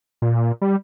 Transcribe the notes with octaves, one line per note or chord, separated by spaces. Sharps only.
A#2
G3